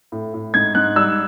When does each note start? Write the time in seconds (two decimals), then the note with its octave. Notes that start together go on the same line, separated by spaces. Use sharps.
0.12 A2
0.34 A2
0.54 G#2 G#6
0.75 G#2 F#6
0.96 G3 E6